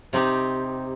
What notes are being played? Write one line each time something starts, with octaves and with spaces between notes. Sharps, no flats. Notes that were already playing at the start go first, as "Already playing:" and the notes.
C3 C4 D#4 G4